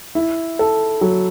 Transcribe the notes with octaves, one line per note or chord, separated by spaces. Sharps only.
E4
A4
F#3